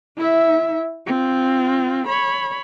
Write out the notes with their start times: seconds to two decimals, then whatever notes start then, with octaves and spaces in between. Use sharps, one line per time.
0.17 E4 E5
1.06 C4 F4
2.07 C#5 B5